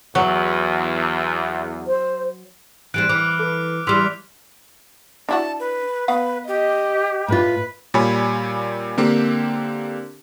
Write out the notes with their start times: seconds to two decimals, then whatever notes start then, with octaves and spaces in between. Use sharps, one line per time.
0.15 E2 F#3
1.87 C5
2.94 E3 G3 C4 F#6 D7
3.09 E3 D6 F6
3.39 A4 B4
3.87 E3 G3 C6 E6 F6 B6 F7
5.29 D4 E4 F#4 A5
5.60 B4
6.08 B3 B4 F5 F#5
6.48 G4 D#5
7.28 A2 F4 B4
7.94 A#2 G3 C#5 G#5 B5
8.98 D3 A#3 C4 G4